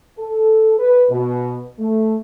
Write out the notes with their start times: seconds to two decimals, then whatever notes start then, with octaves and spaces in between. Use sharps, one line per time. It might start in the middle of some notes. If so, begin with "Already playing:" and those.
0.19 A4
0.78 B4
1.10 B2
1.79 A3